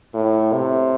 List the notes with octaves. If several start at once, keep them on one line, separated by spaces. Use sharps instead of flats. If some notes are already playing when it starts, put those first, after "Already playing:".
A2
C3